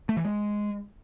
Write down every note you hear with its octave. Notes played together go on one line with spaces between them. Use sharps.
A3
E3
G#3